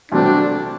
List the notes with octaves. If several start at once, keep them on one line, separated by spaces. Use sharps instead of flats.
C2 B2 F#3 A3 C4 D4